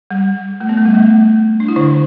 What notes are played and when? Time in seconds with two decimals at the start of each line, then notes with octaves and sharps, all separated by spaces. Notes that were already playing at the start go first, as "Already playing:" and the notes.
0.11 G3
0.60 A3
0.69 B3
0.77 A3
0.85 G3
0.94 A3
1.60 D4
1.68 E4
1.76 D3 D4